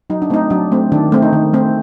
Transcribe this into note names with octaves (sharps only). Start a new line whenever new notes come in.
F#3 D#4
D4
A3 C4 D#4
F#3 D4
A3 C4
D#3 D4
A3 C4
D#4
D#3
A3 C4